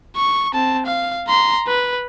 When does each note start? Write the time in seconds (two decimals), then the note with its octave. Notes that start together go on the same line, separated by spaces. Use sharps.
0.16 C#6
0.54 C4 A5
0.86 F5
1.28 A#5 C6
1.67 B4